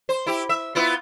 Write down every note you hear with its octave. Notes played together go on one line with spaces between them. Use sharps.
C5
E4 G4
E5
B3 E4 F4